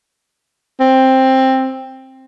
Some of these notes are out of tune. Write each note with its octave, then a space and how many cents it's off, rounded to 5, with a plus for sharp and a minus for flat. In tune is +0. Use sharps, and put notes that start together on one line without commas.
C4 +10